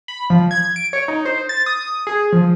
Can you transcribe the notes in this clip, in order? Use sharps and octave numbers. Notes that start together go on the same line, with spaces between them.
B5
F3
G#6
D7
C#5
D#4
C5
A6
D#6
G#4
F3